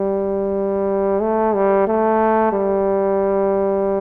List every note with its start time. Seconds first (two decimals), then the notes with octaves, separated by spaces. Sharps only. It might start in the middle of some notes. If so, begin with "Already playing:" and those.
Already playing: G3
1.22 A3
1.55 G3
1.87 A3
2.52 G3